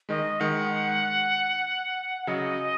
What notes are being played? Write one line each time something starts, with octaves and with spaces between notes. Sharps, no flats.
D#3 G#3 D#5
D#3 G#3 F#5
F#5
C#3 F#3 D#5